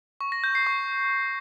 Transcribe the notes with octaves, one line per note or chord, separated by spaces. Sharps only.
C#6
A#6
G6
C7
C#6